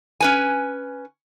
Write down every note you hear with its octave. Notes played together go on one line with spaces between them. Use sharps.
C#4 B4 G#5